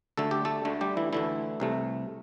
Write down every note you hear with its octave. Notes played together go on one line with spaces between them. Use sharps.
D2 D3 A3 A4
G4
A3 A4
D2 D3 A3
G3 G4
E3 E4
D2 D3 E3 A3 E4
C2 C3 A3